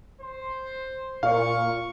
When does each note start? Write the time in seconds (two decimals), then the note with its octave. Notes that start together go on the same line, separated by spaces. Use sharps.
0.22 C5
1.23 A#2 F5 C#6